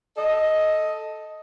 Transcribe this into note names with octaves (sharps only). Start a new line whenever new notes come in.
A4 D#5